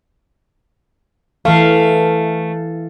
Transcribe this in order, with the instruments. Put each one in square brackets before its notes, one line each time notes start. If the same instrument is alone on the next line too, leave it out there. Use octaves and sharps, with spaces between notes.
[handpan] E3 F5 [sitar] A3